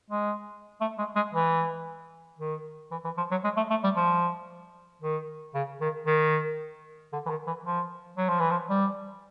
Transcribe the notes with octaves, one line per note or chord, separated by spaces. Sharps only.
G#3
A3
G#3
G#3
E3
D#3
E3
E3
F3
F#3
G#3
A3
A3
G3
F3
D#3
C#3
D#3
D#3
D3
E3
D#3
E3
F3
F#3
F3
E3
F3
G3